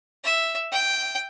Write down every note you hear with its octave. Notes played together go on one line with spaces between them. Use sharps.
E5
G5